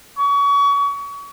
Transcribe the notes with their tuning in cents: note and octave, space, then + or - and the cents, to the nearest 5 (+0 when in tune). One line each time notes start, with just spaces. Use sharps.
C#6 +30